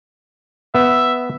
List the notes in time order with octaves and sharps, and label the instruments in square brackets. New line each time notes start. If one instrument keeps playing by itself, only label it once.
[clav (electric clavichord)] B3 [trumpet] E5